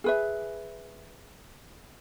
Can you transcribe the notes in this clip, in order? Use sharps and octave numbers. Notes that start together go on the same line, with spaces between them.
G#4 B4 E5